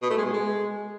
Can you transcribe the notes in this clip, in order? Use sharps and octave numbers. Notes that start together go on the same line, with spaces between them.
B2
A3
G#3
B2
G#3